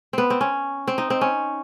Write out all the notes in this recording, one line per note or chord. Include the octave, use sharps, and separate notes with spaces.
B3 C4
C4
C#4
C4
D#4
C4
C#4